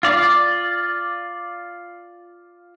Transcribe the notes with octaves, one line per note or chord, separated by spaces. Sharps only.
F4 D5